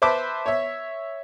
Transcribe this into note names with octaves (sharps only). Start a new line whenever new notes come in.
B4 C5 E5 A5 B5 D6
C#5 E5